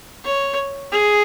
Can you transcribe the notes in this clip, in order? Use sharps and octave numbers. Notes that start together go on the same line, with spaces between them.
C#5
G#4